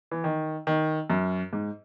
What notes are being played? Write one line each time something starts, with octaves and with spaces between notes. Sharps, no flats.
E3
D#3
D#3
F#2
G#2